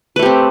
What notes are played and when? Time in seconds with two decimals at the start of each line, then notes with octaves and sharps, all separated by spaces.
0.16 B4
0.19 A3
0.22 G4
0.26 C4